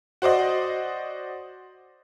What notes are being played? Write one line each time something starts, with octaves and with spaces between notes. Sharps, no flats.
F#4 C5 D5 D#5